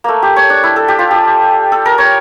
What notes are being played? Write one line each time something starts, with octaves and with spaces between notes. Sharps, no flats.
A3 A#3
G4
C#5
D4
E4
A4
G4
F4
G4
A4
A#4
C#5